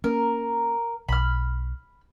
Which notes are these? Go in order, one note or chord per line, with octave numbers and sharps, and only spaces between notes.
A#3 C#4 A#4
B1 B5 F6